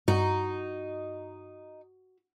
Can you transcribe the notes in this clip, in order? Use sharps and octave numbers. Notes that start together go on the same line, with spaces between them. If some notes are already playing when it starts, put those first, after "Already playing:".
G2 D#4 F#4